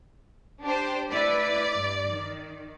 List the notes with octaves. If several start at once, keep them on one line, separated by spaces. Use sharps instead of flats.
D4 G4 C5 D5
A3 E4 B4 D5
G2
D#3